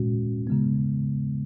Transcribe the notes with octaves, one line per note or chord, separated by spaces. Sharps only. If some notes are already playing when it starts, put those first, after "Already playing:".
Already playing: A#2 G#3 C#4 F#4
C#3 G#3 B3